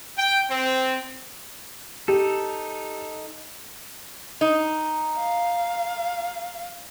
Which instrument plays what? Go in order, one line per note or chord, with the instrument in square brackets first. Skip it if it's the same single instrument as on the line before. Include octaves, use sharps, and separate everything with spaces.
[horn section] G5
C4
[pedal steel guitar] D#4 A4 [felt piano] G4
[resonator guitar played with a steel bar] D#4
[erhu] F5